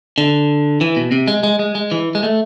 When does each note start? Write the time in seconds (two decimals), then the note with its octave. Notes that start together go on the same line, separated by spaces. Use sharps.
0.18 D3
0.81 E3
0.96 B2
1.12 C3
1.28 G#3
1.43 G#3
1.59 G#3
1.75 G#3
1.92 E3
2.15 G#3
2.23 A3